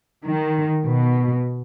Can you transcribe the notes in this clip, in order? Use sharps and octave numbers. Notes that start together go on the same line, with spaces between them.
D#3
B2